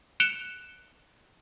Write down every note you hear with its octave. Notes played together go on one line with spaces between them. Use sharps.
F#6 C#7 D7 E7 F7 G7